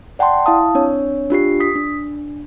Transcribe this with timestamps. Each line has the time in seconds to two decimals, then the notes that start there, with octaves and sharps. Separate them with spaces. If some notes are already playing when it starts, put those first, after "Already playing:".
0.19 D5 F#5 G5 A5 C6
0.46 E4 F5 A5 D#6
0.75 C4 D4 C#5
1.30 D4 F4 G4 C7
1.60 D#6 B6
1.76 D4